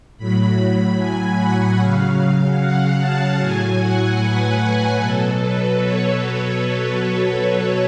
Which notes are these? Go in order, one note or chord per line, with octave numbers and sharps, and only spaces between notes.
A2 F#3 B5
G#5
F#5
C#3 F#3 F5
F#5
A5
A2 F#3 G#5
F#5
B4
B4
B2 F#3 A4
B4
C#5